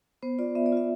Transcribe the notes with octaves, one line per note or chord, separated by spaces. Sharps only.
B3 C5
F4 D5
B3 E5
D5
F4 E5